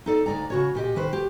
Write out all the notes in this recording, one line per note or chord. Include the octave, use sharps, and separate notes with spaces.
D#4 A4 D5
D2 C3 D#4 D5 A#5
C#3 F#4 C#5
A#2 G4 D#5
D#3 B4 C5
G4